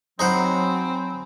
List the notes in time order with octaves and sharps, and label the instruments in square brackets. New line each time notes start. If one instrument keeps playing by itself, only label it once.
[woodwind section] F#3 [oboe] C4 [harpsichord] D#4 C5 F#5 [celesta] G#5 B5